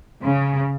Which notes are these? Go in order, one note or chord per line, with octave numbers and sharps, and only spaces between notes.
C#3